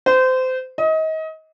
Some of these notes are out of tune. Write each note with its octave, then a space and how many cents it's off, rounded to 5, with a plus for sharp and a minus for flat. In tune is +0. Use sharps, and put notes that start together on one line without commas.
C5 -25
D#5 +30